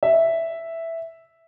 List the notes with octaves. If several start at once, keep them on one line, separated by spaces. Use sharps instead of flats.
E5